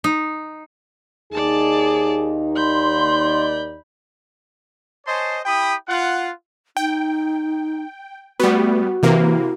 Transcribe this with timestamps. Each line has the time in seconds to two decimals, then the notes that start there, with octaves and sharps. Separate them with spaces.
0.04 D#4
1.32 D#2 D#4 G#4 D5 A5
2.56 D5 B5 C6 G6
5.06 C5 C#5 D#5 G#5 A5 C6
5.45 E4 G4 G5 B5 D#6
5.88 F4 F#5
6.77 D#4 G5
8.40 G3 A3 B3 F#4
9.03 C3 E3 A#3 E4